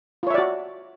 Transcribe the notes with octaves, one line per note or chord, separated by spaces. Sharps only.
F4 F#4 C#5 D5 E5